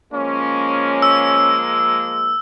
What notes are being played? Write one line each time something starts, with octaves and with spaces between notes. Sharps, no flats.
F3 G#3 A#3 C#4
E6